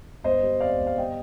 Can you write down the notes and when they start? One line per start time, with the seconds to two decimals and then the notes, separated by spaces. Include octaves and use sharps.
0.24 G1 C5 D#5
0.42 G3
0.60 F2 D5 F5
0.79 G1
0.87 F5
0.97 G3 D#5 G5